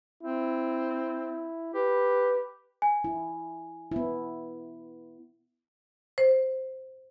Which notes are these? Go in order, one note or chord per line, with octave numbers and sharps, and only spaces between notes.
C4 E4
G4 B4
G#5
E4
B3 E4
C5